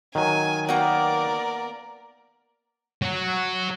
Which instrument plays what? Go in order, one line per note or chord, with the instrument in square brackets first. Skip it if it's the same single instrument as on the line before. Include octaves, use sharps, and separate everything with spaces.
[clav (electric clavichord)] D#3 F#3 [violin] G#5
[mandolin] A#3 B3 [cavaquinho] F#4 G5 A#5 [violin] A#4 D5
[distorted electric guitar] F#3 F#4